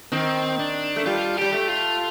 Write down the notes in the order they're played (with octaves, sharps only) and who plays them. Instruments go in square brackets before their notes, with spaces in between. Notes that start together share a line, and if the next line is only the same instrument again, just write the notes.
[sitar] D#3 [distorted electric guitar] C4
[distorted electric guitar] D4
[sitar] A3
[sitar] G3 [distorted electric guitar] F4
[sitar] G3 [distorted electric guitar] G4
[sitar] A3
[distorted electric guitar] F4